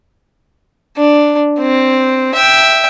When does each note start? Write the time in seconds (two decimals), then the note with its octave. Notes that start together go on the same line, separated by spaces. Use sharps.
0.97 D4
1.59 C4
2.35 E5 G5